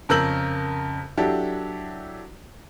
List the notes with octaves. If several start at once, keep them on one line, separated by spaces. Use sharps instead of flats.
F2 C#3 A#4 E6 G6 F#7
F#3 D4 E4 G4 A4